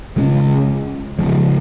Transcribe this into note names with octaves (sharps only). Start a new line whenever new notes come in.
C#3 G#3 C#4
C#3 F3 G#3